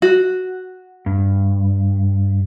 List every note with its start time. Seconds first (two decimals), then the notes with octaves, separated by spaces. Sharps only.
0.02 F#4
1.06 G2